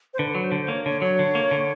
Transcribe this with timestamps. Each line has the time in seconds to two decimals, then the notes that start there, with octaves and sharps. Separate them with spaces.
0.14 C5
0.18 D3 B4
0.35 F#3
0.44 C5
0.52 D3
0.62 C5
0.68 A#3 C#5
0.85 D3 C#5
1.02 F#3 C#5
1.19 D3
1.35 A#3
1.51 D3